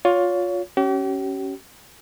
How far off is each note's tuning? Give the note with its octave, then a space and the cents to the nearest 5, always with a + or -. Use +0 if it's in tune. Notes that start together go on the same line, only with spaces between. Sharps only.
F4 +20 C#5 +25
C#4 +0 G4 -40